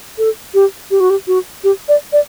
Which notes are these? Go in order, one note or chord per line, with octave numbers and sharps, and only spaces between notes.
A4
G4
G4
F#4
G4
F#4
G4
D5
D5